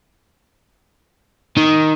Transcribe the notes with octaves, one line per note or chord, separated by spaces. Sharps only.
D#3